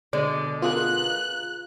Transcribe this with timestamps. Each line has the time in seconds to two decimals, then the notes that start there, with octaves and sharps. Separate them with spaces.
0.13 B2 D3 G#3 D5
0.62 B3 F4 G#4 A#4 F#6